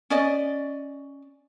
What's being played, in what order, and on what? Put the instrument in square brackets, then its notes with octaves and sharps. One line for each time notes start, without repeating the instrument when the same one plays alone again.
[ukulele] C#4 D5 D#5